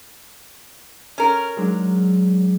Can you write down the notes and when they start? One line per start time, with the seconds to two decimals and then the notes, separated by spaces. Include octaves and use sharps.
1.18 C#4 A#4
1.57 F#3 G#3 D4